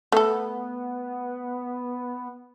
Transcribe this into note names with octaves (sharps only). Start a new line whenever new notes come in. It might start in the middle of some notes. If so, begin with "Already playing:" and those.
A3 B3 A4